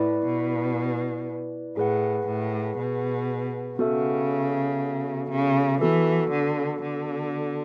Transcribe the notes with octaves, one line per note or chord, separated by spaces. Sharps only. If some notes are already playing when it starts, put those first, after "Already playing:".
Already playing: A2 E4 B4 D5
B2
A2 G#4 B4 F#5
A2
B2
C#3 B3 F#4 A4 E5
C#3
E3 B3 F#4 A4
D3
D3